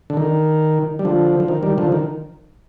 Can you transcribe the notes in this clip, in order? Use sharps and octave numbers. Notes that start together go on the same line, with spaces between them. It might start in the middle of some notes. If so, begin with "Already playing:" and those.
D3
D#3
G3
D3 F3
F3
D#3
D#3 G3
D3 F3
D#3